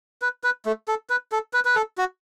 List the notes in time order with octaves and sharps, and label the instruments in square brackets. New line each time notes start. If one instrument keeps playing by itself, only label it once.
[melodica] B4
B4
A3
A4
B4
A4
B4
B4
A4
F#4